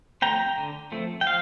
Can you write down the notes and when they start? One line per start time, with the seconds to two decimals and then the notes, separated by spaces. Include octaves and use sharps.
0.22 F3 A3 C4 G5 A#5
0.57 D3
0.92 F3 A3 C4
1.21 G5
1.26 F3 F5